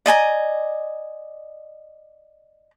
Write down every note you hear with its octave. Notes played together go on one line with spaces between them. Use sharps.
D5 D#5 G#5 A#5